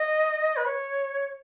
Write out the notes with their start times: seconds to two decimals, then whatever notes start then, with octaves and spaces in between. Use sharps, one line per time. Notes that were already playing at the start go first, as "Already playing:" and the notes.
Already playing: D#5
0.56 B4
0.66 C#5